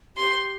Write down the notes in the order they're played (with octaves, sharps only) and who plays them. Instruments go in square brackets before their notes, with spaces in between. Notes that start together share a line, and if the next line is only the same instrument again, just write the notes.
[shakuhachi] G4 [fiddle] C6